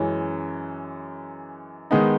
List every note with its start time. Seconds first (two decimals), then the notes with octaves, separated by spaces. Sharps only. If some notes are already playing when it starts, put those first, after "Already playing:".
Already playing: F#2 E3 G#3 C#4
1.91 D#3 G#3 B3 D#4